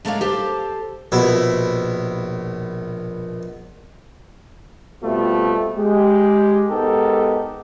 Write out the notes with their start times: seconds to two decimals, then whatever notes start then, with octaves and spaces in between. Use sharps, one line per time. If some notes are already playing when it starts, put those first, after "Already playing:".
0.05 G#3 A3 D4 A#4 C#5 F5
0.21 G4 A4 C5
1.12 A#1 B2 E4
5.02 B2 G3 A3 C4 F4
5.76 G#3 G4
6.69 G#2 B3 D#4 G4 A4 A#4